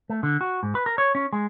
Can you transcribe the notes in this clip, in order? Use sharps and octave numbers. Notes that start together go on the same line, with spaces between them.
A3
D3
F#4
G#2
B4
A#4
C#5
C#4
G#3